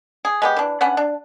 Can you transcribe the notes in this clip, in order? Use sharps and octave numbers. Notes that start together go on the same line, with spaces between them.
G#4
G#3 B3 G4
E3 D4
B3 C#4 D4 F#5
D4